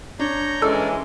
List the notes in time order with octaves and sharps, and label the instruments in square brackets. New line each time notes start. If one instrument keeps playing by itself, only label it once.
[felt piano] D4 [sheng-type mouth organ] C#5 A#5 G6
[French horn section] E3 G#3 C#4 [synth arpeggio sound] A4 [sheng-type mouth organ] A#4 D5